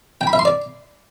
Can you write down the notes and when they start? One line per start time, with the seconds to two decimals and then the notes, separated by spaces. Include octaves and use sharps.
0.21 G5
0.27 B5
0.33 E5
0.39 C6
0.45 D5